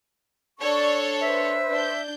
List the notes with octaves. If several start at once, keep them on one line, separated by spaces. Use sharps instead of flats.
D4 A4 C#5 D5 C#6
B4 C5 E5
D4 G6